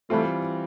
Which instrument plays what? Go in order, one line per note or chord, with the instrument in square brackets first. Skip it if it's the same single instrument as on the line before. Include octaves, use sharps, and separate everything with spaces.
[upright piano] E3 G3 C4 F4 [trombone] A3